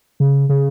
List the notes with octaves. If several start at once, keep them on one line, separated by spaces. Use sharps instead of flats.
C#3
C#3